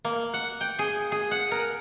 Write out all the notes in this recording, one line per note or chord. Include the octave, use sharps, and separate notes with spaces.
A#3
F#5
G5
G#4
G#4
F#5
A#4